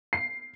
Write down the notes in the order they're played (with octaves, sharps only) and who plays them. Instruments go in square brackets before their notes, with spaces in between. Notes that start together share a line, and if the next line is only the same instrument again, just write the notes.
[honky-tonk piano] C7